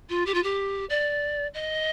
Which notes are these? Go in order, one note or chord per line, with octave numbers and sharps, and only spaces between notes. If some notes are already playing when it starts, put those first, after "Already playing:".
F4
G4
F4
G4
D5
D#5